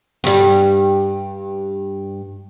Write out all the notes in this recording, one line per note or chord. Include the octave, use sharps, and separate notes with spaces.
G2 G3